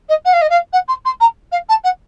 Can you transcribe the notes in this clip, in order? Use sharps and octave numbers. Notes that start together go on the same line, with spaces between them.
D#5
F#5
F5
D#5
F5
F#5
C6
C6
A#5
F5
A5
F#5